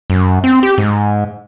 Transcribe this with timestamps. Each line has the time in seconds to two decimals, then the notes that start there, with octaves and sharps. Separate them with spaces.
0.10 F#2
0.44 C4
0.63 G4
0.78 G#2